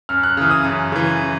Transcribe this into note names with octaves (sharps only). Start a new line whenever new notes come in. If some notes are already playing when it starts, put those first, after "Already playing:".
F#2 F6
F#6
C#3 E3 F6
D#6
F#2
C#3 E3